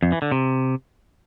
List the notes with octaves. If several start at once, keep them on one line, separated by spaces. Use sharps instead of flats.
F2
E3
D3
C3